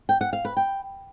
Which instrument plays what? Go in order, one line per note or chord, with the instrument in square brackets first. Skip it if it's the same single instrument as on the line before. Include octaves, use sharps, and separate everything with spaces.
[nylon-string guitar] G5
F#5
F5
B4
G5